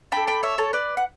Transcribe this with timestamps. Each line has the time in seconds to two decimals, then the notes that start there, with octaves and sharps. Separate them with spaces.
0.12 D4 A4 G5 B5
0.27 G5 B5
0.43 C#5 E5
0.58 A4 C#5
0.73 B4 D5
0.97 F#5